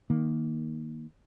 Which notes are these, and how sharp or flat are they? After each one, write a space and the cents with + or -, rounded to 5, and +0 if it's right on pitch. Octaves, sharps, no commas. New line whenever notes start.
D#3 +0 A#3 +10